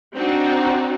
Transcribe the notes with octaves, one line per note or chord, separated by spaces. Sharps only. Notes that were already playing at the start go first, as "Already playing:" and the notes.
C4 D4 D#4 F#4